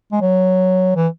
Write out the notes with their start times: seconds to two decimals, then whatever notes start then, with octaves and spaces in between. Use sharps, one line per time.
0.12 G#3
0.21 F#3
0.96 E3